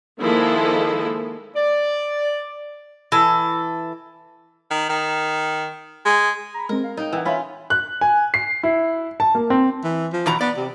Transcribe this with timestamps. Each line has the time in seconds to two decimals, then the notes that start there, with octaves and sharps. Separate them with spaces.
0.19 D#3 F3 G#3 A#3 E4 A4
1.56 D5
3.12 E3 A4
4.71 D#3
4.89 D#3
6.05 G#3
6.54 A#5 B5
6.69 G#3 C4 A#4
6.84 F5
6.97 D#4 G5
7.13 E3 F#5 G5
7.25 C#4 F4 E5 B5
7.70 F#6
8.01 G#5
8.34 C7
8.63 E4
9.20 A5
9.35 A#3
9.50 C4
9.84 E3
10.13 F3
10.26 E2 B2 A#5
10.41 B3 D5
10.57 C3